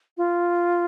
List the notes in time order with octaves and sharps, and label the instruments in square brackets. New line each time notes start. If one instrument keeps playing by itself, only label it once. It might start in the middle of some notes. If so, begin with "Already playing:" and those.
[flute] F4